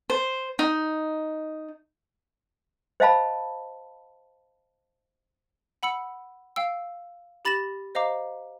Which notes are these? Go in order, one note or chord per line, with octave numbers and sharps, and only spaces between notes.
C5
D#4
C5 D#5 F5 A5 B5
F#5 B5 E6 C#7
F5 G5 E6
G4 B5 A6 A#6 E7 F#7
C5 D#5 F5 A#5 D6